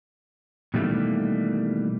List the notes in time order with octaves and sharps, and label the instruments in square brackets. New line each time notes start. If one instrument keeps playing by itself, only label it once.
[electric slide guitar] B2 D#3 E3 G3 A3 A#3